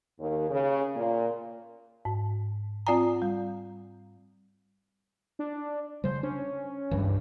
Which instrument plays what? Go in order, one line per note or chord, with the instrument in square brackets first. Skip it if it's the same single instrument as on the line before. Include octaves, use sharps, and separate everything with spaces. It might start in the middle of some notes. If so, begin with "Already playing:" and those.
[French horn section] D#2
C#3
A#2
[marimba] G#2
C4 F4 D5 F#5 G#5 A#5
G3
[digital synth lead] D4
[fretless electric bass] C#3 G3 [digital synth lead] C5
[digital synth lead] C#4 [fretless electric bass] D4
[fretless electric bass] C#2 E3 [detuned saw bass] G2